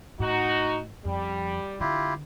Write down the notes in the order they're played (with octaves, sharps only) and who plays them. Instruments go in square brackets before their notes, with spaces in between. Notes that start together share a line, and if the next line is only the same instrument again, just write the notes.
[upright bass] A2 [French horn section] D#4 F#4
[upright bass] F2 [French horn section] G3
[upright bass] D3 [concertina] E4 F4 G4